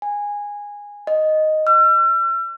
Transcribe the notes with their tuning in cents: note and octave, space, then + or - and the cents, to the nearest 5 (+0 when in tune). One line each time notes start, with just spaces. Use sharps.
G#5 -15
D#5 +0
E6 +45